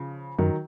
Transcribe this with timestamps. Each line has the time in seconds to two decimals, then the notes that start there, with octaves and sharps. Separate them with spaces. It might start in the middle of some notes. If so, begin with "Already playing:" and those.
Already playing: C#3 F3
0.39 F#2 D#3 F#3